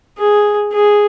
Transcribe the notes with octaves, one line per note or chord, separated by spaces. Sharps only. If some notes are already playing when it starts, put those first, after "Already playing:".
G#4
G#4